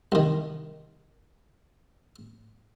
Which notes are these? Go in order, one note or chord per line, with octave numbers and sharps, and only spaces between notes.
C2 D#3